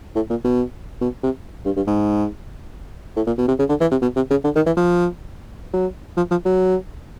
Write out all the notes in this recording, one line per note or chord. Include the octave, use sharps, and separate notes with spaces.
A2
A#2
B2
B2
C3
G2
G2
G#2
A2
A#2
B2
C3
C#3
D3
E3
C3
B2
C3
C#3
D3
D#3
E3
F3
F#3
F3
F3
F#3